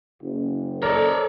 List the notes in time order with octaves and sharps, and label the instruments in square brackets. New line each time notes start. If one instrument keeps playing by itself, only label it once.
[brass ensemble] F#1
[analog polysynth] A4 [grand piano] A#4 [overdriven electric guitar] C#5 D5